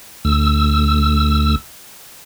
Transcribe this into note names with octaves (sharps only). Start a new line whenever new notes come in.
D2 E6